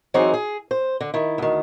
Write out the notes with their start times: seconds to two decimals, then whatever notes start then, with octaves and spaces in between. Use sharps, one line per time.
0.14 E3 F#3 C4 D#4 G#4 C5
0.34 G#4
0.71 C5
1.01 D3
1.14 D#3 E4
1.38 D2 D#3